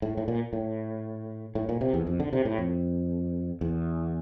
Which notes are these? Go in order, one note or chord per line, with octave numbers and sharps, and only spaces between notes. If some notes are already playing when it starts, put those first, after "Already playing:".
A2
A2
A#2
A2
A2
A#2
C3
E2
F2
D3
C3
A2
F2
E2